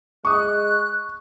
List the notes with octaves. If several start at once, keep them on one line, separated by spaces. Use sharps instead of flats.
G#3 C#6 D#6 F#6